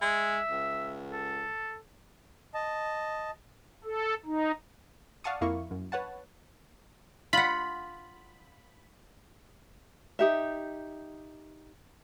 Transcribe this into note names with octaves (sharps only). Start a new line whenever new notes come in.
G#3 E5
C#2
A4
D#5 A5
A4
D#4
D5 F5 F#5 A5 C#6 D#6
F2 A#3 E4 C#6
F#2
B4 C#5 F#5 A5
F4 F#5 B5
D#4 G4 E5